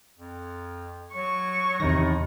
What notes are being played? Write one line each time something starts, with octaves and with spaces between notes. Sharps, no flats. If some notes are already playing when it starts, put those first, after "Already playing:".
F2
F#3 C#6
E2 A2 C3 D#3 D#4 A#6